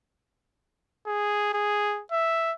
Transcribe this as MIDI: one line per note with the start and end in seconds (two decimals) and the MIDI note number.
1.07 1.52 68
1.54 2.02 68
2.12 2.53 76